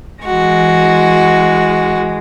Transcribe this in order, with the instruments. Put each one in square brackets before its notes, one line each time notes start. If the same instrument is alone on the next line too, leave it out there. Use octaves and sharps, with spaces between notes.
[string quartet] E3 G#3 [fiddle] F#4